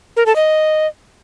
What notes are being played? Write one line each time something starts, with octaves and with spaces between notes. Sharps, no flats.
A#4
A4
D#5